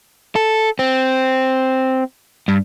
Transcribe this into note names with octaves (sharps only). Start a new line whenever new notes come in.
A4
C4
G2